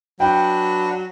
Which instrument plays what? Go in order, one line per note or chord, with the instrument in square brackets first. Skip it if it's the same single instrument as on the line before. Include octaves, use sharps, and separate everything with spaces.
[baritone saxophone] F#3 [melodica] D4 B4 F#5 [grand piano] G5